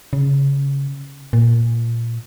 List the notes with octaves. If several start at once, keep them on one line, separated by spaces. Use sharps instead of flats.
C#3
A#2